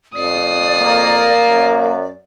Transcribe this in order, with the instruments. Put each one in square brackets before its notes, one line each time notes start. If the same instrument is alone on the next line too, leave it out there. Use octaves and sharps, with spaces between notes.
[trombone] F2 [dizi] D5 [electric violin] D#6 C7
[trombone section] A#3
[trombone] F#2